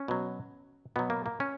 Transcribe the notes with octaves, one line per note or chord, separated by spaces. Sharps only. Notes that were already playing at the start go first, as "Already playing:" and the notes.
Already playing: C#4
B2 F#3
B2 F#3 B3
A#3
A#3
C#4